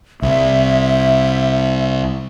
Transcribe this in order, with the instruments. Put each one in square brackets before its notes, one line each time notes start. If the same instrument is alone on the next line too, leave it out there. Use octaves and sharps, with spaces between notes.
[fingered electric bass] C2 [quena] E5